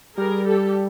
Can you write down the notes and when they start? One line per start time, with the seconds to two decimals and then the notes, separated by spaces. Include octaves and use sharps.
0.17 G3 G#4 A#4
0.47 G4 A4